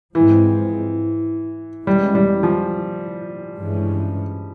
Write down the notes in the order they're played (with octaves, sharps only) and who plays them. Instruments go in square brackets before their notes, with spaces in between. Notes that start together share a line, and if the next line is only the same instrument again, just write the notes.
[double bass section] G#2 F3 G#3 C4 [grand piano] E3
[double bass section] E2 E3 G#3 C#4 [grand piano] G3
[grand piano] G3
F3
[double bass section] G2 E3 G#3 C#4